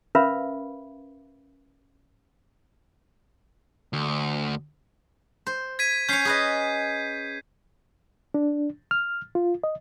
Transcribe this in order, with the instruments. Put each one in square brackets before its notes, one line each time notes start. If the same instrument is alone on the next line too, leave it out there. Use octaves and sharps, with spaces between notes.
[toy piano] C#4 A#4 B4 E5 F5 B5
[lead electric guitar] D2
[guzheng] C5
[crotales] G#6 B6 D#7
[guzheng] C#4 C#5 [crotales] G6 B6 C7
[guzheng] G#4 B4 D#5
[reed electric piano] D4
F6
F4
D#5